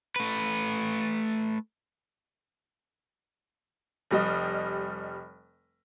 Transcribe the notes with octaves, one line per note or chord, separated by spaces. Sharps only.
A3 B4
F1 G3 D#5